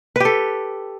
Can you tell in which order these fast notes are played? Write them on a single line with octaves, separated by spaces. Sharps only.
B4 G4 A4